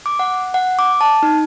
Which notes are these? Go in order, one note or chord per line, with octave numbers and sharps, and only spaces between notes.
D6
F#5
F#5
D6
A5
D#4